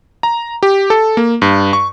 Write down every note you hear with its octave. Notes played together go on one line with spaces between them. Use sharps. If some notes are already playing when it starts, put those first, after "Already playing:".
A#5
G4
A4
A#3
G2
C#6